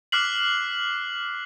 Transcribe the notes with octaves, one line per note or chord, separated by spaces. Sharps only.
D6 F6 F#6 B6 C7 F#7